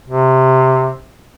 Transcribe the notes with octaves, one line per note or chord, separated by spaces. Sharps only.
C3